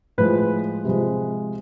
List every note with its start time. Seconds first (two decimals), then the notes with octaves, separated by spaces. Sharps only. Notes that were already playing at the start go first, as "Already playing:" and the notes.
0.18 A2 F3 G#3 B4
0.85 C3 F3 G#3